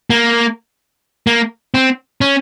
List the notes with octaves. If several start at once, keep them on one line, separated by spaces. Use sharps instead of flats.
A#3
A#3
C4
C#4